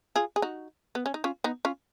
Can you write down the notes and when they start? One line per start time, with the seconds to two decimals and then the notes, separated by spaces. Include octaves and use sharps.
0.16 F4 G#4
0.36 G#4
0.42 D#4 F#4
0.95 B3
1.06 C#4
1.14 D#4
1.24 C#4 F4
1.44 B3 D#4
1.65 C#4 F4